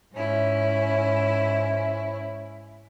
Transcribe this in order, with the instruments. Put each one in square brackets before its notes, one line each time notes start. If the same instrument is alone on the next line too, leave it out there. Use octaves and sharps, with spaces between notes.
[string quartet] G#2 C#4 E4